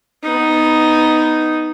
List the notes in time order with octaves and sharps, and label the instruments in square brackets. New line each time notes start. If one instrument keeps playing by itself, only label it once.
[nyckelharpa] B3 D#4